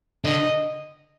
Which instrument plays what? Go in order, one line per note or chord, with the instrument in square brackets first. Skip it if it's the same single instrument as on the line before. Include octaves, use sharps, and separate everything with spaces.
[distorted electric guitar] D3 [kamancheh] D#5